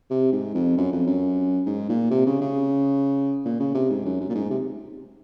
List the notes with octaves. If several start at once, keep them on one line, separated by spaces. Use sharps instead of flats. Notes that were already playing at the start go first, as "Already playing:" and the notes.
C3
G#2
F2
F#2
F2
F#2
G#2
A#2
C3
C#3
C#3
A#2
C#3
C3
G#2
F#2
F#2
A#2
G#2
C3